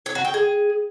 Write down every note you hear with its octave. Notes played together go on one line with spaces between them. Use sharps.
C#5
F#4
G5
G#4